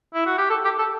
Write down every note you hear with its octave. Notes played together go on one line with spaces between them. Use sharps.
E4
F#4
G4
A4
G4
A4